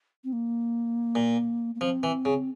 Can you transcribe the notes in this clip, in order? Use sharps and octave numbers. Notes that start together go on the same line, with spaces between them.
C4
A#3
A#2
A#3
F3 C4
E3
C#3